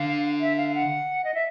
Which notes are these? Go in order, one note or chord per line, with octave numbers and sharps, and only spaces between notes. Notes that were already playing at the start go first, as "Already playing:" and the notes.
Already playing: D3 F5
E5
F5
F#5
D#5
E5